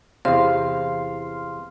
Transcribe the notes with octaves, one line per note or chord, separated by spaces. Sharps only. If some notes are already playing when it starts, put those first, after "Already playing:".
E2 C3 F5 C6